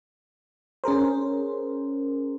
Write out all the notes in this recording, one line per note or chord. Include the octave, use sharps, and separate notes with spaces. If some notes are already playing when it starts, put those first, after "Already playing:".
C#4 G#4 A#4 C5